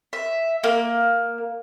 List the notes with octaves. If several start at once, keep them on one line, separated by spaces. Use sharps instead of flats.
E5
A#3